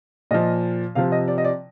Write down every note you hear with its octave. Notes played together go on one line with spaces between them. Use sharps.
A#2 F3 D#5
C3 F3 F5
D#5
D5
D#5
D5